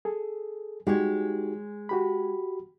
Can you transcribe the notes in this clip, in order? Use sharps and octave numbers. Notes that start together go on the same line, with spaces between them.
G#4 A4
G#3 D#4 F#4 G4 C#5
F#4 G4 B5